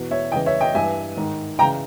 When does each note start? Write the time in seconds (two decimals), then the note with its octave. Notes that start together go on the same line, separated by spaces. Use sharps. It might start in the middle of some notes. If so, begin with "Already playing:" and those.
Already playing: E2 B2
0.11 C#5 E5
0.32 E2 C#3 E3 D#5 G5
0.46 C#5 E5
0.60 D#5 G5
0.75 G2 E3 E5 G#5
1.17 G#2 D#3
1.59 C#3 E3 G5 A#5